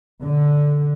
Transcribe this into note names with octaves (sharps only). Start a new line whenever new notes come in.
D3